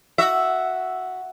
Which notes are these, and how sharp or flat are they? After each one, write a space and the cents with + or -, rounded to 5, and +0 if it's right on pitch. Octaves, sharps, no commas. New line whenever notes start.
F#4 +0 E5 +0